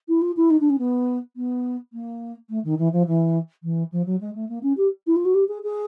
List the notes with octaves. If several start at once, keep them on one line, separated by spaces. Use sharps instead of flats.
E4
F4
E4
D#4
D4
C#4
B3
B3
A#3
A3
D#3
E3
F3
E3
E3
F3
F#3
G#3
A3
A#3
C#4
G4
E4
F4
F#4
G4
G#4
G#4